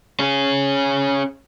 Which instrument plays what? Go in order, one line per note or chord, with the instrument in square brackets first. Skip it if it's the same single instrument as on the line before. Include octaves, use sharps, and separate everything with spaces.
[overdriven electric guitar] C#4 G#4